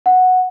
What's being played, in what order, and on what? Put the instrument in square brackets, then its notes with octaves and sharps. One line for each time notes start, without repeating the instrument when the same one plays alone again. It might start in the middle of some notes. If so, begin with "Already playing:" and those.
[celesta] F#5